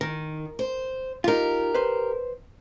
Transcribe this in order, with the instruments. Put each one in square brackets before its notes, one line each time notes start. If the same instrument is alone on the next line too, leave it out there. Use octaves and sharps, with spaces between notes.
[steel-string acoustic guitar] D#3 [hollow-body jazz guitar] A#4
[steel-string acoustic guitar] C5
[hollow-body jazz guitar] D#4 F4 [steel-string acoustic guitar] G4 A#4
[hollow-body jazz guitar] B4 C5